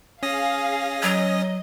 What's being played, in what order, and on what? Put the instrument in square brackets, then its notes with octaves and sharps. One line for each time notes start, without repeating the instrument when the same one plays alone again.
[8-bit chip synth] C#4 D#6 A#6 [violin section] G#4 F5
[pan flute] F#3 [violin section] D#5